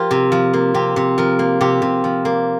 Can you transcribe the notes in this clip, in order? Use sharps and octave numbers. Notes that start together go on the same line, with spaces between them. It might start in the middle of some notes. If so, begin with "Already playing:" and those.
Already playing: F3 A#3 F4 G4
C3
F3
A#3
C3 G4
C3
F3 A#4
A#3
C3 G4
C3
F3
A#3